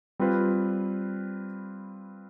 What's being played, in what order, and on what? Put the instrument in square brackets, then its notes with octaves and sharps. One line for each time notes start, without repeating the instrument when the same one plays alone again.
[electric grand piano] G3 C4 F4 B4